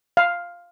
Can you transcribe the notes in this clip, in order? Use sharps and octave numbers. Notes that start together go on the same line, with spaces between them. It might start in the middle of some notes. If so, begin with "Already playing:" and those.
F5